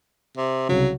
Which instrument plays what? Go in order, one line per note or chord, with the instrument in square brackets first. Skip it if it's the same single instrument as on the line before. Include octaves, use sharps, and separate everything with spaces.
[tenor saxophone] C3
[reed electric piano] C2 C#3 [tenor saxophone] F#3